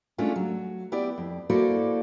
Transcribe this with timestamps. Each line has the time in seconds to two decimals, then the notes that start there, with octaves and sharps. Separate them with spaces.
0.18 G#3 A3 C#4 D4 F4
0.36 F#3
0.92 B3 E4 G4 D5
1.18 F2
1.49 A#3 E4 F#4 A4 C5 D5